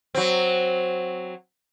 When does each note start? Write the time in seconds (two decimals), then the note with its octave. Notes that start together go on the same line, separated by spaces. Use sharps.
0.15 F#3 C4